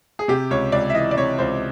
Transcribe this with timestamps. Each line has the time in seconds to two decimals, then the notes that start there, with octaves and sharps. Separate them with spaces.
0.19 G#4
0.28 C3 G4
0.50 C#2 C#5
0.72 C#2 D5
0.90 E5
0.94 E3 D#5
1.11 D5
1.16 C3 C#5
1.39 C#2 C5